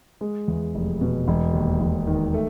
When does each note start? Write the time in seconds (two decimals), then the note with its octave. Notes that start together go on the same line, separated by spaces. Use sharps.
0.21 G#3
0.48 E2
0.75 F1
1.01 B2
1.28 E1
1.54 D#2
1.81 E1
2.07 D#3
2.34 A3